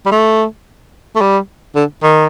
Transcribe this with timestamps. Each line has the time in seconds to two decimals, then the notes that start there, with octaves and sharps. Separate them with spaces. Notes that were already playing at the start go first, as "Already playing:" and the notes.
0.06 G3
0.12 A3
1.16 A3
1.21 G3
1.75 D3
2.03 D#3